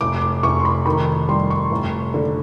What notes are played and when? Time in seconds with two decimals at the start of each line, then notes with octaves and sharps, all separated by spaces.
0.01 F1 D6
0.22 D6
0.43 F1 C#6
0.59 C6
0.65 B5
0.86 D#3 B5
1.29 G3 C6
1.50 C#6
1.71 F1
2.14 D3